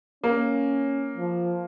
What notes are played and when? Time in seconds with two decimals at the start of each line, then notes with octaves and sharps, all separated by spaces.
0.24 A#3 C#4
1.17 F3